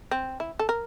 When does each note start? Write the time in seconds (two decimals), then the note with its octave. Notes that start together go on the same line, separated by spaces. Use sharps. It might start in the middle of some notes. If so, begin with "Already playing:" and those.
0.11 C4
0.40 E4
0.59 A4
0.69 A#4